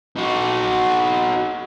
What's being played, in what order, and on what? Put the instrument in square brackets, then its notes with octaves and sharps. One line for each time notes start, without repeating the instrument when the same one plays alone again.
[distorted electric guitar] D#4 F#4